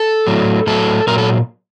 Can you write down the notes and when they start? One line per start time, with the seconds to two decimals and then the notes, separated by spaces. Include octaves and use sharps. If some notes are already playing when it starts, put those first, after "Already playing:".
Already playing: A4
0.27 A2 F#3
0.67 A2 F#3 A4
1.07 A#2 F#3 A#4
1.18 A4